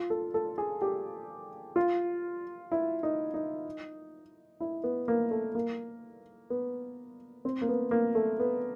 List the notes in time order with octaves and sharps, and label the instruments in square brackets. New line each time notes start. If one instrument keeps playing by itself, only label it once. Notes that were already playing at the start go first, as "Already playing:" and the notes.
Already playing: [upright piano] F4
A4
A4
G#4
G4
F4
E4
D#4
D#4
E4
B3
A#3
A3
A#3
B3
C4
A#3
B3
A#3
A3
B3